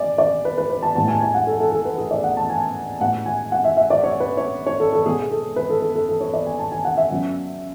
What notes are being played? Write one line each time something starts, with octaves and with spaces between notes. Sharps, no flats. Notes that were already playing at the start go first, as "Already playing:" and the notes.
Already playing: D5 G#5
D5
B4
B4
B4
A5
A2 G#3 B3 A5
G#5
G#5
F#5
A4
A4
A4
B4
G#4
D5
F#5
A5
G#5
A2 G#3 B3 F#5
G#5
F#5
E5
E5
D5
C#5
B4
C#5
C#5
A4
A4
B2 G#3 B3 G#4
A4
B4
A4
A4
A4
A4
C#5
D5
G#5
A5
G#5
F#5
E5
C#3 F#3 B3